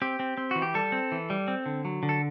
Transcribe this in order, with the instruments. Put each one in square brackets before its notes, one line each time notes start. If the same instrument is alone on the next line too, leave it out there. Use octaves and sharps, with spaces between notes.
[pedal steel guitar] C4 G4
C4
C4
E3 F#4
G4
G3 A4
C4
E3
G3
C4
D3
F#3
D3
A4